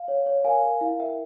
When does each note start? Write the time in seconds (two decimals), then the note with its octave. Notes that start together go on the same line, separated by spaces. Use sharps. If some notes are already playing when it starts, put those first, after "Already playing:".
Already playing: F5
0.08 C#5
0.26 C#5
0.44 A#4 F5 G#5
0.63 A#4
0.81 E4 F5
1.00 A#4 E5 G5